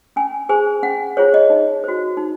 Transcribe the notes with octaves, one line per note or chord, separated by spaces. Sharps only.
C#4 G#5
G#4 C5 G#5
C#4 F#5
F4 G#4 C5 C#5
D#5
D#4
F#4 C5
D#4